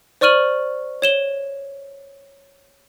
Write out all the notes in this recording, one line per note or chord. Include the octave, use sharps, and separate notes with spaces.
C5 D5 C#6 F6 D#7 F#7
C#5 E7 G7